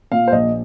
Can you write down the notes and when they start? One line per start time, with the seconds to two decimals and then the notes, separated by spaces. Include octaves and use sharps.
0.11 A#2 F5
0.28 C5
0.32 A#1 D#5